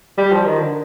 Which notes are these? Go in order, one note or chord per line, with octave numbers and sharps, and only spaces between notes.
G3
F3
D#3
D3